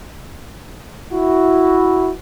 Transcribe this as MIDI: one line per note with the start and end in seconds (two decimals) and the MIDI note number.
1.12 2.11 64
1.12 2.11 66